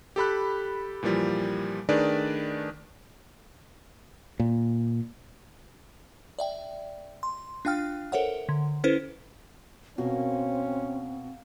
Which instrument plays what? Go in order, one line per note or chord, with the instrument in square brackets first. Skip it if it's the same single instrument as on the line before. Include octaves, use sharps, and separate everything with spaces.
[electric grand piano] G4 A4 B5 F#6
A#2 E3 F3 G3
D#3 A3 D4 G#4 B4 D5
[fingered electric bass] A#2
[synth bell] D5 E5 G5
C6
D4 F4 F5 G5 F6
A4 A#4 C5 C#5 E5 F#5
D3
C#4 E4 A4 B4 C5
[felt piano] B2 [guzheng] A#3 [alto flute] C4 [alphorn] C#4